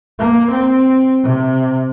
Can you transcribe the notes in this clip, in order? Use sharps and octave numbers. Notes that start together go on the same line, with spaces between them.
A#3
C4
C3